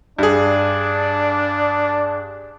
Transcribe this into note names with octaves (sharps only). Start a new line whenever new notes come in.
G2 D4 G#4